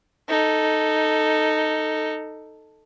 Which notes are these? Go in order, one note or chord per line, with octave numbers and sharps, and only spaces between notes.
D#4 A4